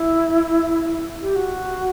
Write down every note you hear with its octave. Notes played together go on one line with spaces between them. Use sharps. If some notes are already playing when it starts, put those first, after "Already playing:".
Already playing: E4
G4
F#4